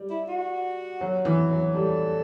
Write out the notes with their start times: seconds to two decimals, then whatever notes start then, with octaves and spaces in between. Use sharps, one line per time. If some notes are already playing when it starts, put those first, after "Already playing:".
Already playing: G3
0.10 E4
0.28 F#4
1.01 F#3
1.25 E3
1.51 F#3
1.74 G3 A4